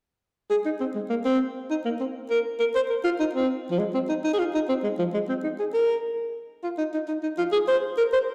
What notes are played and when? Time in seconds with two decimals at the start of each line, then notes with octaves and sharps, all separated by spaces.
0.51 G#4
0.65 D#4
0.80 C4
0.95 G#3
1.10 A#3
1.25 C4
1.70 D#4
1.85 A#3
2.00 C4
2.30 A#4
2.60 A#4
2.75 C5
2.90 A#4
3.04 F4
3.20 D#4
3.35 C4
3.71 F3
3.79 G#3
3.94 C4
4.09 D#4
4.24 D#4
4.33 G#4
4.39 F4
4.55 D#4
4.69 C4
4.84 G#3
4.99 F3
5.14 G#3
5.29 C4
5.44 D#4
5.59 G#4
5.74 A#4
6.64 F4
6.78 D#4
6.94 D#4
7.08 D#4
7.23 D#4
7.38 F4
7.52 G#4
7.68 C5
7.98 A#4
8.13 C5